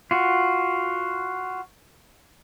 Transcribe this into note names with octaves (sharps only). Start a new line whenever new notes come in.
F4 F#4